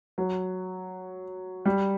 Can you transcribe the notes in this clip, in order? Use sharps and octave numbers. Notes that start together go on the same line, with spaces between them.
F#3
G3